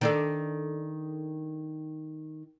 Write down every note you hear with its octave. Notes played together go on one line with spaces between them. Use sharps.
D#3 D4 A4